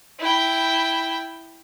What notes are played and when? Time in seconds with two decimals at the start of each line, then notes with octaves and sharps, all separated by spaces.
0.19 E4 G5